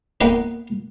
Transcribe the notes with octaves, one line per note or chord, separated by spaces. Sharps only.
A#3 B3 D#4 B4